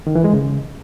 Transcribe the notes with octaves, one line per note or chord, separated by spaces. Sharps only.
D#3
E3
G#3
C#3